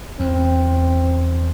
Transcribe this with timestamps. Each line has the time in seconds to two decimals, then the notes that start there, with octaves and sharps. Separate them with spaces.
0.20 E2 C4